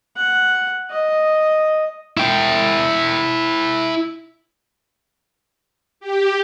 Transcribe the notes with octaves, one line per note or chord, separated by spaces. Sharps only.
F#5
D#5
E4 G5
G4